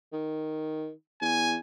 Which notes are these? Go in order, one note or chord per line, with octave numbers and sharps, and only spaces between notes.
D#3
E2 G#5